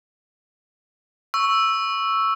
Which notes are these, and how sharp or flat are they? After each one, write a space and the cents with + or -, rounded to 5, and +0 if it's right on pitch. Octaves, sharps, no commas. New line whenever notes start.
C#6 +0 E6 +0